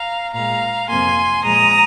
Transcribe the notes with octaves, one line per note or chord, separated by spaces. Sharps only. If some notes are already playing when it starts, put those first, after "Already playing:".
Already playing: F5 A#5
A#2 G#3 F5 A#5
F2 C3 F3 A#3 G#5 C6
A#2 F3 G#3 A#5 D#6